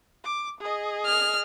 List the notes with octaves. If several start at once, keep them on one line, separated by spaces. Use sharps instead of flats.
D6
G#4 D#5
F6